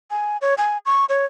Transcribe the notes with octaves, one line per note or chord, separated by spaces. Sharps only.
G#5
C#5
G#5
C#6
C#5